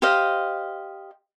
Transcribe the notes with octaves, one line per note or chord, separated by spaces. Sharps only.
G4 C5 D#5 F5